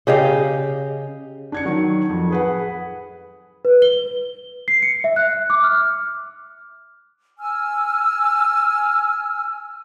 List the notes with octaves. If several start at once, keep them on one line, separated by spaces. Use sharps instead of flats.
C#3 G4 D#5 F5
D4 G#6 C#7
D#3 F#3
F2
G#4 B4 F#5
B4
G7
C7
C#7
E5
F#6
D6
F6
G#5 E6 F6